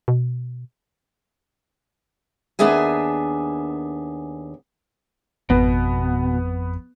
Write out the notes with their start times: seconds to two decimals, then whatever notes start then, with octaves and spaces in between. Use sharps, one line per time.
0.08 B2
2.59 D#2 B3 D4 G#4 E5 G#5
5.50 G#1 F2 B2 B3